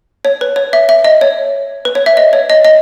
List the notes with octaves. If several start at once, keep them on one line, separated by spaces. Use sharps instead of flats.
C#5
B4
C#5
E5
E5
D#5
C#5
B4
C#5
E5
D#5
C#5
D#5
D#5